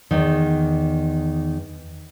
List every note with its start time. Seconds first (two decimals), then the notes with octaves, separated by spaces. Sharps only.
0.11 E2 D#3